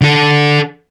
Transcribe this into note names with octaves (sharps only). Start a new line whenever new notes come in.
D3 A4